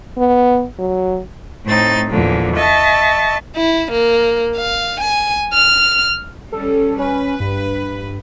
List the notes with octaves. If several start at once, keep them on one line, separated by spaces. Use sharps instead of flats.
B3
F#3
A2 A3 C4 D#4 A6
E2 A#2 D3 F3
D#5 E5 A5 C#6
E4
A#3
F5
G#5
F6
G3 C#4 A4
C#4 B4
G2